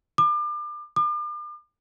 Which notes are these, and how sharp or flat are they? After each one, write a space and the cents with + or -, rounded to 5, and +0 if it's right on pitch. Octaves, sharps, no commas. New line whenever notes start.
D6 +35
D6 +40